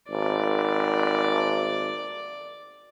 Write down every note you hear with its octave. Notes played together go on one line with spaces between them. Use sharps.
G#1 D5